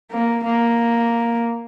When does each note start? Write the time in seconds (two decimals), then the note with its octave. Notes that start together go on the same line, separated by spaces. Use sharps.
0.11 A#3
0.45 A#3